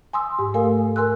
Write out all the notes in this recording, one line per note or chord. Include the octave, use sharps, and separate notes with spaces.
G#5 C6 D#6 E6
G#2 G4
A3 A4 A#4 F5 G#5
A#4 G#5 C6 E6 F#6